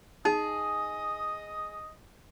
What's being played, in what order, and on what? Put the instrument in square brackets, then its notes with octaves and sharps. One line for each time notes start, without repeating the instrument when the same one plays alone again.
[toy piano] D#4 [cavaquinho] G#4 [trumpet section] D#5 D#6